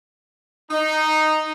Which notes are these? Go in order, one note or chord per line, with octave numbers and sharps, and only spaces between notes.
D#4